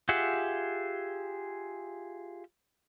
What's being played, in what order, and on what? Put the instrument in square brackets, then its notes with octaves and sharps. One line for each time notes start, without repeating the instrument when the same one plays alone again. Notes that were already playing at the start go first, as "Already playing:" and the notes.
[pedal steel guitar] F4 G4 G#4 E5 F#5